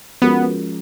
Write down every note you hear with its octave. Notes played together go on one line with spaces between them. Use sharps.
F3 G#3 B3 C#4 F#4 A#4